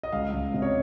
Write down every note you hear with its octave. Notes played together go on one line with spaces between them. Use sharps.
D#5
C#2 F5
C#2
C3 D#5
C#5